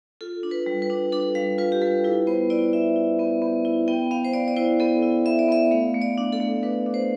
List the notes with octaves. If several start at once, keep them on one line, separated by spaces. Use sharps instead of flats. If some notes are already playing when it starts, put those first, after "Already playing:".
F4 A4
D4
B4
G3
B4
D4
D4 A4
G3 F5
F4 B4
G4
G3 A4
E4 B4
B3 C5
E4 D5
E4 E5
E4
B3
B3
E4
B3 G5
B3 F5
C5
B3 D5
D5
E4 C5
B3 A4
E4
B3 E5
D5
B3 E5
A3 F5
A3
D5
D4
A4
A3
D4 B4
D4
C5